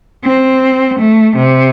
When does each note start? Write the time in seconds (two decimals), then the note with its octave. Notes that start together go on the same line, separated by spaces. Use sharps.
0.24 C4
0.98 A3
1.35 C3